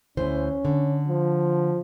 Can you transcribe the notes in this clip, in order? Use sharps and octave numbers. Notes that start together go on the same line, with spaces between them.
D2 E3 C#4 C5
D3
F3